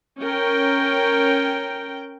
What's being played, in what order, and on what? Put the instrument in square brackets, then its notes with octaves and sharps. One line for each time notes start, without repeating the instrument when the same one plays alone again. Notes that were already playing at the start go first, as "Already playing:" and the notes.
[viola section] C#4 A#4 G5